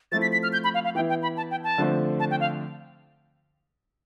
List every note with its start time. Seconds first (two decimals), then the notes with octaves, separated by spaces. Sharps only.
0.12 F3 A3 C4 E4 A6
0.22 B6
0.33 B6
0.43 F6
0.53 G6
0.64 B5
0.74 F5
0.85 F5
0.95 E3 B3 E4 G5
1.09 G5
1.23 B5
1.37 A5
1.51 G5
1.64 A5
1.78 D3 F3 A3 C4
2.20 A5
2.31 G5
2.40 F5